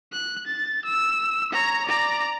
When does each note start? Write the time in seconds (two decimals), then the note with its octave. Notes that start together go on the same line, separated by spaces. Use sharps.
0.12 F#6
0.47 A6
0.85 E6
1.53 C#5 A#5
1.86 D5 A#5